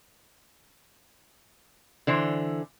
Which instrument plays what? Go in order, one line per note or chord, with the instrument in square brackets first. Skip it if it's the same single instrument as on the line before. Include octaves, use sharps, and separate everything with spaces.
[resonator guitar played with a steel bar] D3 E3 C5